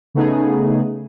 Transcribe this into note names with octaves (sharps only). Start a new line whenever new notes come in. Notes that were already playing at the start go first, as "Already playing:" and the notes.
C#3 A3 B3 D#4 G#4